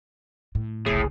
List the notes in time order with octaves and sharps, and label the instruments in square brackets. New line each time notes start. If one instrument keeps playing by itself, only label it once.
[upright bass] A2
[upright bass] F#1 C2 [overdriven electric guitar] A2 [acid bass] G#4